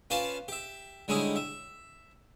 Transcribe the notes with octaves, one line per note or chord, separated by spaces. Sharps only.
C#4 F4 B4 C5 D5 A5
G4 E5
D3 G3 G#3 C#4 D#4 E4
E5